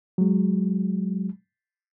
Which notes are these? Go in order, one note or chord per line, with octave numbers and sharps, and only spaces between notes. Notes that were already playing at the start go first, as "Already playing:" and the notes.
F#3 G#3